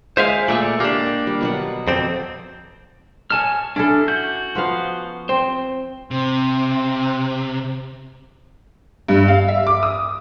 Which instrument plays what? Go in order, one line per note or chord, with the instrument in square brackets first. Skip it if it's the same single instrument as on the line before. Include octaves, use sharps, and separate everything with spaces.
[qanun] G#3 G#5 [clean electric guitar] C5 E5 F5
[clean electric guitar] A#2 A3 [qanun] D5 E5 C#6
[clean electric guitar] A#3 D4 [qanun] G4
[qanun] G3
B2 F#3 F#5
[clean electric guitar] F2 C4 [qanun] D5
[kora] C#5 D#5 [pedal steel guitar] G#5 A5 F6
[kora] C#4 E4 A4 [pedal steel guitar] D4
[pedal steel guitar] F#4 G6
[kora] F3 B3 F5
[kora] C4 [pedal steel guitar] C5
[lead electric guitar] C3 [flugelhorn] C4
[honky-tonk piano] G2
F5
E5
D6
D#6